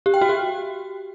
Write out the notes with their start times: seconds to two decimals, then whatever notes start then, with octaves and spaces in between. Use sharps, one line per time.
0.06 G4
0.14 G5
0.21 F#4
0.29 G4